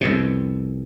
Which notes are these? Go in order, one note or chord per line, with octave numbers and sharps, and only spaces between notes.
C2 F2 B2